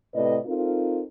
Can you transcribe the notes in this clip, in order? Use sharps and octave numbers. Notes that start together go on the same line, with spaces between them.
A2 C3 B4 D5 D#5
C4 D#4 F4 A4 A#4